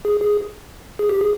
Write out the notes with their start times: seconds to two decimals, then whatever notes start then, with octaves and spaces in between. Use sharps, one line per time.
0.05 G#4
0.21 G#4
0.99 G#4
1.09 G4
1.21 G#4